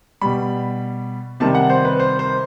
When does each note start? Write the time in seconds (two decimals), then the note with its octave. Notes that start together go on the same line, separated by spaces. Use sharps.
0.22 B2 G3 B5
1.40 C3 D#3 G3 A5
1.55 F#5
1.70 C5
1.85 B4
2.00 C5
2.19 C5